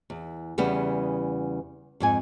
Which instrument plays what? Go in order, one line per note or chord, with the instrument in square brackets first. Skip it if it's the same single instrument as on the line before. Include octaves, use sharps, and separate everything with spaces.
[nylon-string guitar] E2
E2 C#3 G3 B3
F2 G#2 G#5